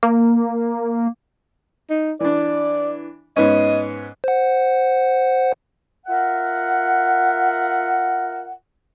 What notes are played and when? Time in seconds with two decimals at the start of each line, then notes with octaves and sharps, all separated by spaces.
0.03 A#3
1.90 D#4
2.20 E3 D4 D5
3.36 G#2 B3 C#4 D#5
4.24 C5 F#5
6.06 F4 A#4 E5 F#5